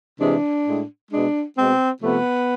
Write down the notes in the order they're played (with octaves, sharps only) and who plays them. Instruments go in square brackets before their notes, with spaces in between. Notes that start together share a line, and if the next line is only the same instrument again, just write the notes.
[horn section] C3 E3 G#3 D4
A2 G#3
B2 G#3 D4
B2 G#3 C4
C3 F3 A3 B3